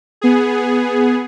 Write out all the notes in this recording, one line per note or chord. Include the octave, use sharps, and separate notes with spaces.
B3 G#4